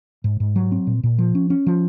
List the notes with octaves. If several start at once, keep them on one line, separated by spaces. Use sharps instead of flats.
G#2
G#2
F#3
C4
A#2
A#2
F3
C#4
C#4
F3